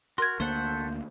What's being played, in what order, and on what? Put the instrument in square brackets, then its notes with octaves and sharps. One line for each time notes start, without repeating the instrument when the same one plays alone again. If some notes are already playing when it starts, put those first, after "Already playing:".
[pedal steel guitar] F#4 [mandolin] A#4 [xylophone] C6 G#6
[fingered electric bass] D2 A#3 [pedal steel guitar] A3 A4 F#5 [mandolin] C5